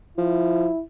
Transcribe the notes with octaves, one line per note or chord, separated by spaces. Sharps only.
F3 E4